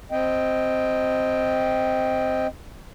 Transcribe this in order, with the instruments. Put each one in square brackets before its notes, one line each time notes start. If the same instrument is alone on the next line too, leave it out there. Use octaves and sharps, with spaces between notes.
[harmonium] C4 D#5 G5